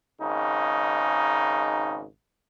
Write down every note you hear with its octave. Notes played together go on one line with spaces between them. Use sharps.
G#1 C#3 D#4